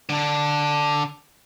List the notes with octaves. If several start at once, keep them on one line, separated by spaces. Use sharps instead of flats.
D3 D4